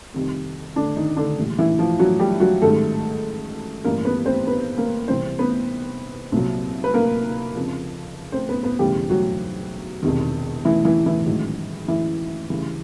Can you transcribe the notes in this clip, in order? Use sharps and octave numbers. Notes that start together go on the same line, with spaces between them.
F2 C3 D#3 G3
D3 D4
D#3 D#4
D3 D4
A#1 A2 E3 G3
E3 E4
F3 F4
F#3 F#4
G3 G4
F#3 F#4
A1 G#2 D#3 G3 A3 A4
A1 G2 E3 G3 A#3 A#4
B3 B4
C4 C5
B3 B4
A#3 A#4
C2 C3 E3 G3 C4 C5
B3 B4
C2 A#2 F#3
B4
A#3 A#4
F2 C#3 F3
C4 C5
B3 B4
B3 B4
E1 D2 C#3 E3 G3 G4
F#3 F#4
E1 E2 C3 D#3
E3 E4
E3 E4
E3 E4
A1 G#2 D#3 F#3
E3 E4
D2 C#3 E3 G3